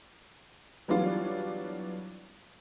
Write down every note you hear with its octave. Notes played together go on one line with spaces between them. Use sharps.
E3 F#3 G3 B3 D4 F4